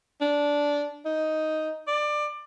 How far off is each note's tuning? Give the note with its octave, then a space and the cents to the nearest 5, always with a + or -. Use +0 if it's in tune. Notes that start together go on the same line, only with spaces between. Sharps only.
D4 -15
D#4 +5
D5 +20